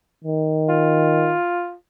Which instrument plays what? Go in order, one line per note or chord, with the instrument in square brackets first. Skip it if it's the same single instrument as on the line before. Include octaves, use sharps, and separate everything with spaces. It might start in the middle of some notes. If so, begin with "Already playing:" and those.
[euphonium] D#3
[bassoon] F4